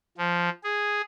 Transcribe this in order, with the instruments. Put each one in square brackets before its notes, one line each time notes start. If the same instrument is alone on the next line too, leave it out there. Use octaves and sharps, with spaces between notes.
[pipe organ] F3
G#4